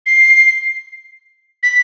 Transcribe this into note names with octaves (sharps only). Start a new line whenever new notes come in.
C7
B6